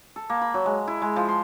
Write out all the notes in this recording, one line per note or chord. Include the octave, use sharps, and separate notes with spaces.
A4
A#3
B5
F#3
G#3
E4
G#3
F3
C6